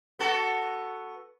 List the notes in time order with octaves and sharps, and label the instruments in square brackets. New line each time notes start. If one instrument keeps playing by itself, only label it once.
[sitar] B3 F#4 A4